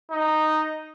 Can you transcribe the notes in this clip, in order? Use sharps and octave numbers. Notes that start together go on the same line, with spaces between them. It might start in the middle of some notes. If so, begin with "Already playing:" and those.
D#4